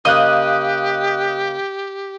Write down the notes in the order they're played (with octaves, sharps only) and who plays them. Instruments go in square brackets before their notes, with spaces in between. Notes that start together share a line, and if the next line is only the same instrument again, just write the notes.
[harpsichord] C#3 A#3 C5 [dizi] G4 [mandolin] D#5 [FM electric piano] D#6 F#6